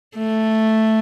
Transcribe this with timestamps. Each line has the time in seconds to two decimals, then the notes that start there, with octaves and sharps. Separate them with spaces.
0.17 A3